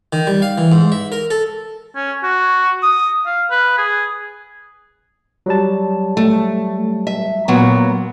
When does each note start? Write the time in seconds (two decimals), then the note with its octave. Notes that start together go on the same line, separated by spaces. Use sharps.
0.13 D#3
0.27 G3
0.42 F5
0.58 E3
0.72 G#2
0.92 E5
1.12 A#4
1.31 A4
1.95 C#4
2.24 F#4
2.83 D#6
3.26 F5
3.51 B4
3.78 G#4
5.46 F#3 G3 A5
6.17 A3
7.07 E5
7.48 A#2 F#3 B3